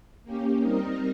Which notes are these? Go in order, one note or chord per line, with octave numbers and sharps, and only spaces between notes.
A#3 C#4 G4
G3 C4 D#4 A#4 D#5